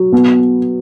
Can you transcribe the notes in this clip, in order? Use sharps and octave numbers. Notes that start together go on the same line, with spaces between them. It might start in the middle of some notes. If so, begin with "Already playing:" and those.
Already playing: F#3
B3